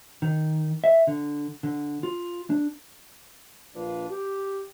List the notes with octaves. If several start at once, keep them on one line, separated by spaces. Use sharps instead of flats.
D#3
E5
D3
D3
F4
D4
A#1 D4 F4 B4
G4